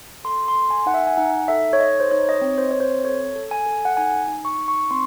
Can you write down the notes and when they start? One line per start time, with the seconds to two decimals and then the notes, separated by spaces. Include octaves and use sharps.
0.25 A4 C6
0.48 C6
0.55 A4
0.71 G#5
0.86 D#4 F#5
0.94 E5
1.07 G#5
1.17 D#4 F#5
1.48 A4 E5
1.73 C#5
1.80 D#4 D#5
2.00 C5
2.11 D#4 C#5
2.29 D#5
2.34 C#5
2.41 C4
2.58 C5
2.71 C4 C#5
2.80 C5
3.04 A4 C#5
3.36 A4
3.51 G#5
3.66 A4
3.85 F#5
3.97 D#4 G#5
4.28 D#4
4.45 C#6
4.59 D#4
4.68 C#6
4.91 C4 C6